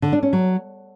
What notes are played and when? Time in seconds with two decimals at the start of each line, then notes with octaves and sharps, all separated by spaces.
0.02 D3
0.12 D4
0.23 C#4
0.33 F#3